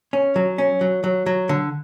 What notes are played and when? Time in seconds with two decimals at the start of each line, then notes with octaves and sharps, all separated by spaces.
0.13 C#4
0.36 F#3
0.58 C#4
0.81 F#3
1.04 F#3
1.26 F#3
1.49 D3